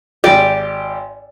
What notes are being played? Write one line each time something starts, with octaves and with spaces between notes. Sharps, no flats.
G#1 G4 D5